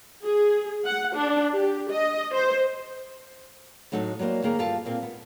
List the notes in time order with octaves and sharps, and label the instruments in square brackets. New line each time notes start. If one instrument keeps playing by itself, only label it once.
[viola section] G#4
F#5
D4
G4
D#5
C5
[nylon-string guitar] A2 F#3 D#4 A4 F#5
F#3 G3 A#3 C5
D#3 A#3 G#4 A#4
G2 F4 G4 A4 F5 A5
A#2 A#3 C4
B3